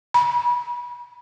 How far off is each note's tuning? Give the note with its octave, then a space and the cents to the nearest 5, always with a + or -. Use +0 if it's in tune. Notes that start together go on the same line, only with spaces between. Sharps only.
B5 -30